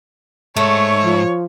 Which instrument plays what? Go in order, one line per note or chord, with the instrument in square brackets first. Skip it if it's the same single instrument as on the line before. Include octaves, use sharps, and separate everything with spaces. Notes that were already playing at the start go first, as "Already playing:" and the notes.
[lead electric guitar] G#2 [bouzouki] A3 [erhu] C#5
[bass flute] F3